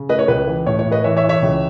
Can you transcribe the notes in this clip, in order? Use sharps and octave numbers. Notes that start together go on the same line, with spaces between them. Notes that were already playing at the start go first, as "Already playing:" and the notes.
Already playing: C#3
A3 B4 D#5
C#5
C#2 B4
E3
A2 C#5
C#5
A2
B4 D#5
E3 C#5 E5
C#5 E5
E3
C#5 E5
C#2